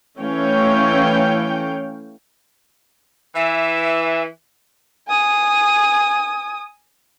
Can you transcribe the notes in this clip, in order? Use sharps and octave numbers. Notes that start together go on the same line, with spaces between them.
E3 A3 C#4 C#5 F5 G5
E3 E5
G#5 D#6